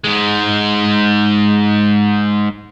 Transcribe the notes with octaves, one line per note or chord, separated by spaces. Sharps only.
G#2 G#3